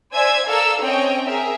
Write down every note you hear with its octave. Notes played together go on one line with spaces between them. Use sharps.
C5 D5 E5 G#5 E6 G#6
A4 A#4 D5 F5 E6
C4 C#4 C#5 D#5 G5
G#4 A#4 E5